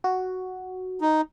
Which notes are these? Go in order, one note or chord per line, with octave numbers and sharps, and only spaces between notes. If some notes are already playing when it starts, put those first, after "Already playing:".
F#4
D#4